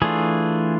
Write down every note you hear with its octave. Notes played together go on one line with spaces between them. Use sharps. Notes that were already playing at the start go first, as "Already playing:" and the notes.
E3 A3 D4 F4 G#4